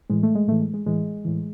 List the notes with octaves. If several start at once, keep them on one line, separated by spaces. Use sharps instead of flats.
A2 E3 G#3
A3
G#3
A2 E3 A3
G#3
G#3
A2 E3 G#3
A2 E3